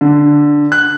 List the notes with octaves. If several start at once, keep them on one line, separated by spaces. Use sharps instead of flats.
D3
F#6